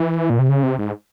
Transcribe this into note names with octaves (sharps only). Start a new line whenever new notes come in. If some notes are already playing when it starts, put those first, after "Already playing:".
Already playing: E3
A#2
C3
C#3
C3
G#2